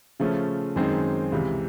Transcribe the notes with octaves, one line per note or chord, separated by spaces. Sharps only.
C#3 F3 A3 C#4
F#2 D#3 G#3 C4 D#4
C#2 C3 E3